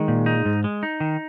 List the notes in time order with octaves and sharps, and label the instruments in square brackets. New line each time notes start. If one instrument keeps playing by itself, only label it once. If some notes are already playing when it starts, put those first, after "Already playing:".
Already playing: [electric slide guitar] D#3 [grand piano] G#3
[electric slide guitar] A#2
D#4
G#2
G#3
D#4
D#3